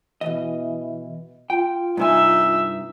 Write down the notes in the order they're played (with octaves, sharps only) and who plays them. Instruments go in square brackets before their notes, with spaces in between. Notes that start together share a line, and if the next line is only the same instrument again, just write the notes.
[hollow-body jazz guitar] B2 D#5 [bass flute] E3
[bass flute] F4 [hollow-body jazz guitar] G5
[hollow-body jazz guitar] G2 C3 G#5 [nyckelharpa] D#4 E5